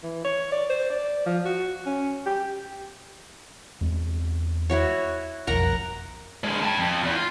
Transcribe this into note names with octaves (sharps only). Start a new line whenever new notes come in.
E3
C#5
D5
C5
D5
F3
F#4
C#4
G4
E2 G#3 C4
E4 F#4 C#5
F#1 B1 F2 A#4 F#5 A#5
D3 G#3
G5 A5
F2
E2
F4